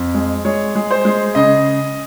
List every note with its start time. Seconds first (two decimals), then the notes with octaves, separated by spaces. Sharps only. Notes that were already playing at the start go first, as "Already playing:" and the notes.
Already playing: F2
0.14 G#3
0.45 G#3 C#5
0.75 G#3
0.91 C5
1.05 G#3
1.35 C#3 D#5